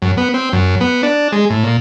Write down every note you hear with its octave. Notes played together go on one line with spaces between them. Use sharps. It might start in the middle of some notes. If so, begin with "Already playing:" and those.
F#2
B3
C4
F#2
B3
D4
G#3
A2
A#2